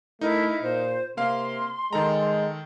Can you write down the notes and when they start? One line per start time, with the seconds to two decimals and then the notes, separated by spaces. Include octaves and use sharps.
0.21 A3 D#4 E4 A#4
0.63 A#2 C5
1.17 C3 A#3 F5 C6
1.93 D#3 G#3 A4 A#5